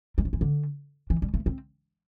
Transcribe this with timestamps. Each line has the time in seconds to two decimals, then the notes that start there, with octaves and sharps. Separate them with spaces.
0.18 G3
0.25 F3
0.33 E3
0.41 D3
1.10 E3
1.22 G3
1.34 A3
1.46 C4